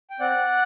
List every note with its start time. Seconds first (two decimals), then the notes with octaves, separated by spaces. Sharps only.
0.10 G5
0.20 C4 D5 F#5